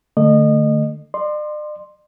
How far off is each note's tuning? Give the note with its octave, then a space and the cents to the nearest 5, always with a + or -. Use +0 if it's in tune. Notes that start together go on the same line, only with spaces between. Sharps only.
D3 +25 A3 +15 D#5 -30
D5 +45 C6 +0